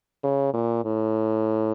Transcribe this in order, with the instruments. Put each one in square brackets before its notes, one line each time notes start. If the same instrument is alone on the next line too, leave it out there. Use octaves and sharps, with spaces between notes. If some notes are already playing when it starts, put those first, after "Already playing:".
[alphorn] C#3
A#2
A2